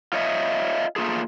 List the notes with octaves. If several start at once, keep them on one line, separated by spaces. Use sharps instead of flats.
F4 C#5 D#5 E5
A3 A#3 F4 G#4